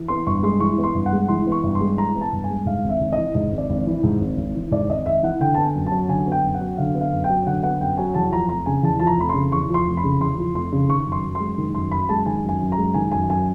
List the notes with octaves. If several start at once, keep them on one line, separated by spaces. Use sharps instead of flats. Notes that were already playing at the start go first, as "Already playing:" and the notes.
Already playing: E3
B3 C6
G2 C#6
G#3 C6
E3 C#6
B3
C6
G2
F#5
G#3
E3 C6
B3
C#6
G2
C6
G#3
E3 A#5
B3
A5
G2
G#5
G#3
G#2 F5
G#1
E5
G#1
D#5
E3
G#2 D#5
G#1
D5
G#1
E3
G#2
G#1
G#1
E3
G#2 D5
G#1 D#5
G#1 E5
E3 F#5
D3 G5
B3 A5
G#5
F#2
A5
F#3
D3 G#5
B3
G5
F#2
F#5
F#3
D3 F5
B3
F5
F#2
G5
F#3
D3 F#5
B3 F#5
F#2 G5
F#3 G#5
E2 A5
F3 A#5
F1 A#5
C#3 G#5
E2 A5
F3 A5
A#5
F1 B5
C#3 C6
E2 C#6
F3
C6
F1
B5
C#3
E2 C6
F3
F1 C6
C#3
D#3 C#6
F#2
C6
F#2
C6
G#3
D#3
F#2 C6
F#2 B5
G#3 A5
D#3 G#5
F#2 G#5
F#2
A#5
G#3
D#3 G#5
F#2 G#5
F#2 G#5